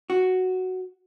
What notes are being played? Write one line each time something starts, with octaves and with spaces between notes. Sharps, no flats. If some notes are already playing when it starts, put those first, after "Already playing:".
F#4